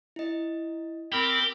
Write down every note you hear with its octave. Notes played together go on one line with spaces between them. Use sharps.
E4 D#5
C4 G4 A#4 B5